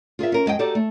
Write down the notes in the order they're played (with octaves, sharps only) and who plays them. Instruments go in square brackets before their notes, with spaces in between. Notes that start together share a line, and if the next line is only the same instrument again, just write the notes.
[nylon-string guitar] F4 G#4 A#4 E5
C#4 A#4
F2 G#3 D#5 G5
D#4 F#4 G4 A4 D5
A3